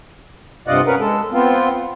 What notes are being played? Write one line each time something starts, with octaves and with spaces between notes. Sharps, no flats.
G2 C3 F4 D5 D#5 F#5
C#4 A#4 B4 F#5
G#3 A4
B3 C4 F4